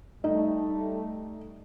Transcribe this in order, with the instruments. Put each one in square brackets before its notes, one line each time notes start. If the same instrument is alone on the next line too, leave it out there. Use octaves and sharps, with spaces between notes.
[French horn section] G3 A3 [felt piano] D#4